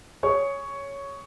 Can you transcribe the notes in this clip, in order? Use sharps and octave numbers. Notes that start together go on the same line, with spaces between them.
G#4 C#5 C#6